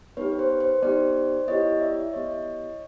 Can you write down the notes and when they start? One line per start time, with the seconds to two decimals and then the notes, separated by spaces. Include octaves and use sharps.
0.17 B3 D#4 G4 B4 C#5
0.32 B4
0.39 C5
0.61 C5
0.83 B3 D#4 G4 C5 D5
1.47 B3 E4 G4 C#5 D#5
1.80 D5 E5
2.13 B3 E4 G4 C#5 D#5